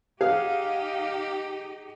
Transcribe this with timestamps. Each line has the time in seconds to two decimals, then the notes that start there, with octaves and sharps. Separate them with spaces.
0.21 D#4 G4 G#4 F5 F#5